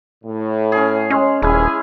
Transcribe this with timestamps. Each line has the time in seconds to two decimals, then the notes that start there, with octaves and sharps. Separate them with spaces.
0.24 A2
0.72 C#4 G#4
1.10 G#3 C#4
1.42 D#1 C#4 E4 G#4 G#5